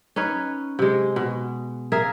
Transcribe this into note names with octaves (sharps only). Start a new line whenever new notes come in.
C#4 D#4 B4 C#5
C3 G#3
B2
G#4 A#4 E5 F5